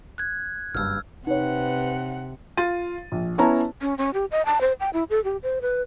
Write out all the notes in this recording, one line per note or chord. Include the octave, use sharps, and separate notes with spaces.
F#6 G#6
F#1 G2 E6 F6
C3 D#4 B4 C#5 F#5
F4 A6 D#7
A#1
B3 C#4 E4 C#5 A5 A#5
C#4
C#4
G4
D#5
A5
C5
G5
E4
A4
G4
C5
B4